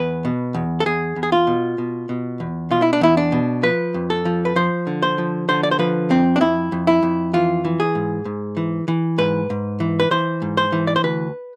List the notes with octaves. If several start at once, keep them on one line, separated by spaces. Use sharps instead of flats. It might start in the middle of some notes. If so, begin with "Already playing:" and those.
Already playing: E2 B4
B2
E2
A4
E2 G#4
E2
G#4
F4
B2
B2
B2
E2
B2 F4
E4
D4
E2 E4
D4
B2
F3 B4
F2
A4
F3
B4
F3 C5
D3
C5
F3
D3 C5
D5
C5
F3 B4
F2 C4
D4
F2 E4
F2
E4
F2
E3 F4
E3
G#4
G#2
G#2
E3
E3
G#2 B4
G#2
E3
B4
E3 C5
G#2
C5
E3
D5
C5
D2 B4